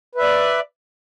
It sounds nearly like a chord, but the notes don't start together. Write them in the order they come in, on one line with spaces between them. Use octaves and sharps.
B4 E5 D5